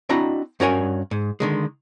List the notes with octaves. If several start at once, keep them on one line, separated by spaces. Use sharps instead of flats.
C4 D4 E4 F#4 D#5 A#5
G2 C#4 F#4 A#4 C#5 G#5
G#2
D3 D#3 G#3